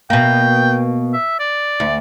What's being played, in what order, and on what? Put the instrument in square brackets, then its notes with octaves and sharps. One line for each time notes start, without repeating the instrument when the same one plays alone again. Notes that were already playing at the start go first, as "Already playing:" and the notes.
[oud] B2 A#3 [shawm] G5
[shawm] E5
D5
[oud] D2